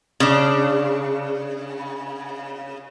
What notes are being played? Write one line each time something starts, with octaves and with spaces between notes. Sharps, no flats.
C#3 D4